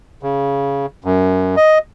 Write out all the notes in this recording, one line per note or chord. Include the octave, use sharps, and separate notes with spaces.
C#3
F#2
D#5